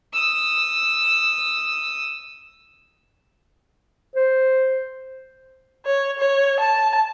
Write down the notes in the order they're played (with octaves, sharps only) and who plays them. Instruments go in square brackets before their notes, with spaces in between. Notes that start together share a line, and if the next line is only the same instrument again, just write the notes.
[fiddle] D#6 E6
[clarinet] C5
[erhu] C#5
C#5
A5